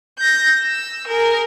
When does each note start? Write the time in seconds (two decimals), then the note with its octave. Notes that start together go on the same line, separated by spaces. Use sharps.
0.19 G6 A#6
0.64 E6
1.07 G#4 A#4